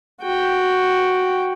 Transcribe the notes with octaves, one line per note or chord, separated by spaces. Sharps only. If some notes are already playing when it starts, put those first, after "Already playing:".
F#4 G5